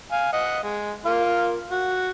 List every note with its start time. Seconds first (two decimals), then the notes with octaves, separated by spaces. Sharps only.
0.12 F5 G#5
0.33 D#5 F#5
0.63 G#3
1.05 A#3 F4 F5
1.71 F#4